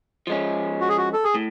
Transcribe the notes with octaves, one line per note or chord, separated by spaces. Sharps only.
F3 G#3 C#4
F#4
G#4
F#4
A4
G#4
A2